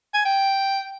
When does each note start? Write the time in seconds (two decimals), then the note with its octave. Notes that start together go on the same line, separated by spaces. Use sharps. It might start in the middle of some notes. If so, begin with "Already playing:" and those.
0.14 G#5
0.25 G5